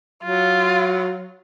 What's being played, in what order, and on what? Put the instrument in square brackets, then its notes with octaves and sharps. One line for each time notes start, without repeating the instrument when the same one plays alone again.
[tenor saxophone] F#3 [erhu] F4